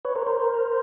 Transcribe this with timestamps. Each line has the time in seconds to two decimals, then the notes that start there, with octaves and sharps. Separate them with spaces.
0.05 B4 C#5
0.16 A#4 C5
0.27 A#4 C5